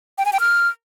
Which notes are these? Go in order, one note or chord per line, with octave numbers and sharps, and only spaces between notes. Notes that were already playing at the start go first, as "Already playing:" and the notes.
G5
G#5
G5
F6